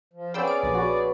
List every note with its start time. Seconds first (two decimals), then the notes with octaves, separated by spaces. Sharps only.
0.13 F3
0.34 B3 C#4 G#4 C5 D5 G5 B5 E6
0.47 F5 D7
0.63 A#1
0.75 F#4 B4